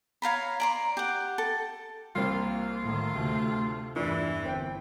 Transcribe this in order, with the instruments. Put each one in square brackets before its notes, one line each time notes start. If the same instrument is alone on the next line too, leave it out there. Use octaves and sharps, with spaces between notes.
[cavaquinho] C#5 F5 A#5 B5
D5 A#5 C6
G4 F#5
A4
[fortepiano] C2 C4 [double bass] A#3 [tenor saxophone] F4
[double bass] A2 D#3
[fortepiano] D2 [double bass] C3 A3
[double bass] E2 G2 [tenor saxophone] E3 [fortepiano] D4 F4
[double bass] G1 [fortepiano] C4 G5